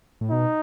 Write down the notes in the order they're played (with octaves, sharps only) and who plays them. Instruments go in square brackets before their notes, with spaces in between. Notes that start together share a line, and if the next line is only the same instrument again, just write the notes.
[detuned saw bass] A2
[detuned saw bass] B2 [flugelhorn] D#4